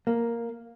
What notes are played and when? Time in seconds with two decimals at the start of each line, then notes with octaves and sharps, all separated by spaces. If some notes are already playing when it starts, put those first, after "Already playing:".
0.07 A#3